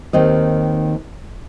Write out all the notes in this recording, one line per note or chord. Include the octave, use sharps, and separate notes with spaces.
D#2 D#3 C4 D#5